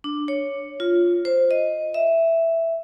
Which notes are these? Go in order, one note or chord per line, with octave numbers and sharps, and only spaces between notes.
D4
C#5
F4
C5
D#5
E5